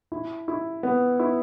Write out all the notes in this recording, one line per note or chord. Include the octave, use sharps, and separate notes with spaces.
E4
E4
B3
E4